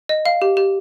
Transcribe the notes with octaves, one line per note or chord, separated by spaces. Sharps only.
D#5
F5
G4
G4